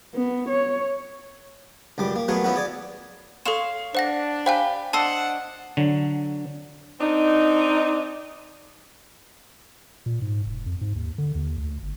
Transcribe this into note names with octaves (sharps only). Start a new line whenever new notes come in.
B3
C#5
C#2 F#2 G3 D6
A#3
F#3 A3 B3 F#4 G#4 A#4
F3 B3 C#4 E4 F#4
G#4 D5 G#5
A4 C#5 F5 C6 E7
D4 C5 F#5 A#6
G4 C5 F5 G5 G#5 B5
D4 C5 D#5 F#5 A5 E6
D3 F#3
C4 D4 D#4
A#2
G#2
E1
F2
G#2
D#2
D3
D#2
D2
G1